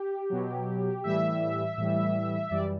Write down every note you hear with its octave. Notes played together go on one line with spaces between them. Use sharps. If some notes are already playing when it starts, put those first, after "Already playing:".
Already playing: G4
B2 F#3
A2 E3 G3 E5
A2 E3 G3
F#2 E3 G3 D5